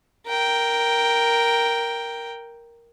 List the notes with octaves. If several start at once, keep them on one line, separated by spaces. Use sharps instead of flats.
A#4 G5